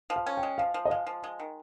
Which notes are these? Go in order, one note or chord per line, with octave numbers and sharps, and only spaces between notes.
F3
F5
C#4
G5
G#3
F3 F5
F3
D#5
G#3 F5
F3
G#3
D#3